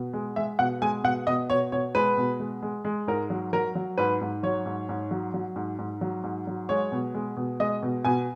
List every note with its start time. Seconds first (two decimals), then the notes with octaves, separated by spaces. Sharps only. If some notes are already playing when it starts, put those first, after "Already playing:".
Already playing: B2
0.13 G#3
0.36 G#3 E5
0.59 B2 F#5
0.82 G#3 G#5
1.04 B2 F#5
1.27 B2 D#5
1.50 B2 C#5
1.72 B2 C#5
1.95 G#3 B4
2.17 B2
2.40 G#3
2.62 G#3
2.85 G#3
3.07 G#2 A#4
3.30 F#3
3.53 F#3 A#4
3.75 F#3
3.98 G#2 B4
4.21 G#2
4.43 F#3 C#5
4.66 G#2
4.89 G#2
5.11 F#3
5.34 F#3
5.56 G#2
5.79 G#2
6.01 F#3
6.24 G#2
6.47 F#3
6.69 G#3 C#5
6.92 B2
7.14 G#3
7.37 B2
7.60 G#3 D#5
7.82 B2
8.05 B2 G#5